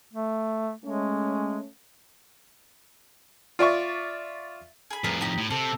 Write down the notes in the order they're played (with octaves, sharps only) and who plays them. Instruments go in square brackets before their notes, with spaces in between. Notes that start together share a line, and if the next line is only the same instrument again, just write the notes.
[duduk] A3
[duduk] G#3 [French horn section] A3 C#4
[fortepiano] F4 D5 E5 C#6
[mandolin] G#4 B5
[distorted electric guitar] F2 A2 [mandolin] G#4 A#4 B4
[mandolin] D#4 G4
[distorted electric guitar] A2
[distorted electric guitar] C3 [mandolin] A4